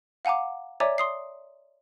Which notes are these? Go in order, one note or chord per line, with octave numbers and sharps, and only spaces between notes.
F5 F#5 G#5 A#5 D6
C#5 D5 E5 G#5 A#5 D6
C6 D#6 C7